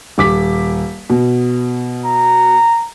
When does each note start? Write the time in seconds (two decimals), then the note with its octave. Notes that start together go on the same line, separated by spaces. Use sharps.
0.18 D#1 D6 B6
1.10 B2
2.05 A#5